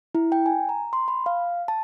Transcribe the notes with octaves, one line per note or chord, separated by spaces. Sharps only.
E4
G5
G#5
A#5
C6
B5
F5
A5